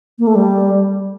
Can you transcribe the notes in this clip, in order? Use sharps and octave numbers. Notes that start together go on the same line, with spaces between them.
A#3
A3
G3